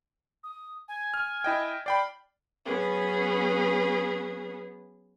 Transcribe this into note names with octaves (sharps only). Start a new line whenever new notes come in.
D#6
G#5
F6
E4 D#5 G5
D5 G5 B5 C7
F#3 B3 C#4 G#4 B4